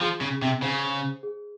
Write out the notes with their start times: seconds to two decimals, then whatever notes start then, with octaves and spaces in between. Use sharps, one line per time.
0.01 F3 G#4
0.21 C#3
0.42 C3
0.62 C#3 C5
1.23 G#4